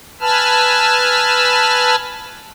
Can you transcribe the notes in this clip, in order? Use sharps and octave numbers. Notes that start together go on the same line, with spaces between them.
B4 G#5 A5 B5 E6 F6